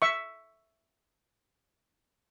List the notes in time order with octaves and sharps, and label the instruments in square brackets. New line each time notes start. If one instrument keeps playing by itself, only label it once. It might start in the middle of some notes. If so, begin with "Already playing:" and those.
[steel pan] E5 C#6